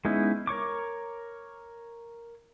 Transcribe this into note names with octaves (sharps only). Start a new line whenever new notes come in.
G#3 B3 C#4 D#4 E4
A#4 C#5 C#6 D6